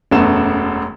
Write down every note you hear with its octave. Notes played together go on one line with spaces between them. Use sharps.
E1 F#2 A3 B3 E7